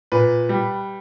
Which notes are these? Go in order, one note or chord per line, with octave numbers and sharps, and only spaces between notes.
A#2 B4
G3